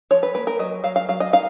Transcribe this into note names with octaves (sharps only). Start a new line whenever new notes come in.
F3 C#5
B4
A#3 B4
A#4
F#3 D#5
F#3 F5
F5
F#3 F5
D#5
D#4 F5